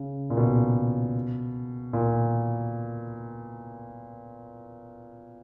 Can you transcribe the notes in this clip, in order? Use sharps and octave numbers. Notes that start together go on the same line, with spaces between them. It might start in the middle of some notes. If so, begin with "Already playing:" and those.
Already playing: C#3
A#2
B2
A#2